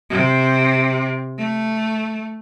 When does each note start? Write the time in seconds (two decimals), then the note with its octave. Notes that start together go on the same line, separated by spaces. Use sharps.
0.10 C3
1.38 A3